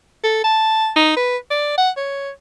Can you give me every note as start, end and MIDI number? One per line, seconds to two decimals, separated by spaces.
0.23 0.40 69
0.44 0.91 81
0.96 1.14 63
1.17 1.37 71
1.50 1.73 74
1.78 1.90 78
1.97 2.30 73